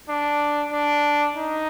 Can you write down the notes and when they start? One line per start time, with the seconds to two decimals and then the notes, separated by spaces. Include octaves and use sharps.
0.09 D4
0.72 D4
1.36 D#4